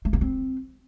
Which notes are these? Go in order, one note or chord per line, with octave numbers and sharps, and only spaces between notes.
A3
A#3
C4